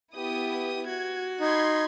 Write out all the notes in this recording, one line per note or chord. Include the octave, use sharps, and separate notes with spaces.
B3 E4 G4 D#6
F#4 G#6
D#4 B5 C6 G#6